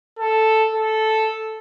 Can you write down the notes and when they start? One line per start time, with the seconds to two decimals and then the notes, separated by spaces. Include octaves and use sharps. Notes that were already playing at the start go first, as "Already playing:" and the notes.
0.19 A4
0.72 A4